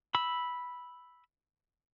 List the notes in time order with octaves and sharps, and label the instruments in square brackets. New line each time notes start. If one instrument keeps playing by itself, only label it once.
[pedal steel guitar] B5 E6